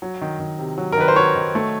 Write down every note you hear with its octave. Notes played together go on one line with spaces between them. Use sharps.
F#3
D#3
D#3
C3
F#3
A#4
D#3 B4
C5
F#3 C#5
D#3
A3